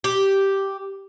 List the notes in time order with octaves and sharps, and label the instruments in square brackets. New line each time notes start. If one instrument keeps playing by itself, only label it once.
[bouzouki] G4